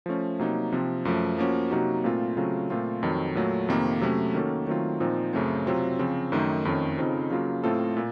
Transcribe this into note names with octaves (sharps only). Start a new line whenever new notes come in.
F3 A3 C#4
C3 F#3 A#3 D#4
C3 F3 C4
F#2 F3 A3
F3 A#3 C#4 F#4
C3 F#3 A#3 D#4 F#4
A#2 A3 C4 F4
C#3 F#3 A3 C4 F4
A#2 A3 C4 F4
F2 D#3 F#3
A#2 F#3 A3
F2 C3 D#3 A#3
C3 F#3 A3 C#4
D#3 A#3 C#4 F#4 A4
D#3 F#3 A3 C4 F4
A#2 F3 C4 D#4
F#2 C#3 A3 C4
C3 F#3 C4 F4
C#3 F3 C4
F#2 D#3 A3 D#4
F2 D#3 A3 C#4
F2 C#3 F3 C4 D#4
C#3 F#3 A#3 F4
A2 A3 C4 F4 A4
A#2